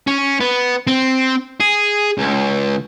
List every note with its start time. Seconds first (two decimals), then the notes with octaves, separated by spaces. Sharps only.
0.07 C#4
0.40 B3
0.87 C4
1.60 G#4
2.18 C#2